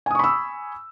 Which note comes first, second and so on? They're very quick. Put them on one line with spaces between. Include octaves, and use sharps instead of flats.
G#5 D#6 C#6 B5 E6